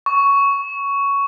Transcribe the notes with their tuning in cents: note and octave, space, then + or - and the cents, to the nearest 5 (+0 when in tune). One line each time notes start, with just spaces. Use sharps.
C#6 +10